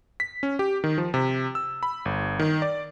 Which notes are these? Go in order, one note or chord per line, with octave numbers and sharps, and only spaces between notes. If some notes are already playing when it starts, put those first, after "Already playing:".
B6
C#4
G4
D#3
F3
C3
E6
B5
G1
D#3
D5